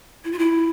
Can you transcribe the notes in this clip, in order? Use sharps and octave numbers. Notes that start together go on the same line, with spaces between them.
E4
F4
E4